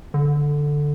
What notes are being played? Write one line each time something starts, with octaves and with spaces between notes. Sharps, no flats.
D3